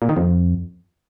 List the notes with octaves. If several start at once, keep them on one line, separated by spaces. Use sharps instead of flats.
A#2
D#3
F2